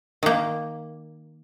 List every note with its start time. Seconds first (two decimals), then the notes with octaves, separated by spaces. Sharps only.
0.23 D#3 A#3